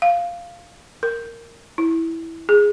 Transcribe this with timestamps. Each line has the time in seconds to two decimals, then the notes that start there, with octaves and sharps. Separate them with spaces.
0.02 F5
1.03 A#4
1.78 E4
2.49 G#4